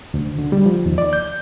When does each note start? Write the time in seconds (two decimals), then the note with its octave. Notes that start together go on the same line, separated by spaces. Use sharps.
0.14 D2
0.38 D3
0.52 G3
0.66 F3
0.86 D#2
0.98 D5
1.13 G6